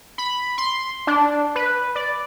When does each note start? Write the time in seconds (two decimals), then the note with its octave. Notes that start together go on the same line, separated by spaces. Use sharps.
0.18 B5
0.58 C6
1.07 D4
1.55 B4
1.95 D5